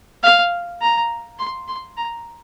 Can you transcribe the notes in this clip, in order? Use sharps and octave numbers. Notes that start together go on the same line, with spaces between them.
F5
A#5
C6
C6
A#5